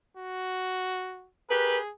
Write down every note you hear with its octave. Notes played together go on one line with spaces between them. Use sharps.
F#4
G4 G#4 A#4 B4